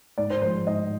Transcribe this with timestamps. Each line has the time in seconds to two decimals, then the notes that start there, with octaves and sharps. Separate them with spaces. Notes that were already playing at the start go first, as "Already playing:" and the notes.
0.18 G#2 D5
0.30 C5
0.42 F3 G#3 C5
0.66 G#2 D#5